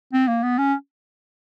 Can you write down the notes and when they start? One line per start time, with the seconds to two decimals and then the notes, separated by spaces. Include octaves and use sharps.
0.13 C4
0.27 A#3
0.43 B3
0.58 C#4